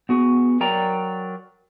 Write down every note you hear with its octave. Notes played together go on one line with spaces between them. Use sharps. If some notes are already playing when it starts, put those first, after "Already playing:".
B3 F#4 G#4
F#3 A#4 D5 G5 A#5